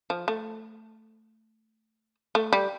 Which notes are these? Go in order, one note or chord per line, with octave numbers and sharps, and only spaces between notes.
F3
A3
A3
G3